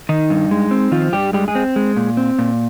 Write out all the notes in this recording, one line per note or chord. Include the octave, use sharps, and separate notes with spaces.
D#3 D#4
G2
G#3
C4
D#3 F3 F4
G2 G3 G4
G3 G#3 G4
G#3 G#4
C4
G#3
A#2
C4
A#2